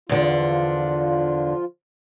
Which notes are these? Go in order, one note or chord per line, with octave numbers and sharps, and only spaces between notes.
E2 D3 F3 F4